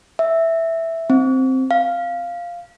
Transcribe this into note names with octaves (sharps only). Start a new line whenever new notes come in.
E5
C4
F5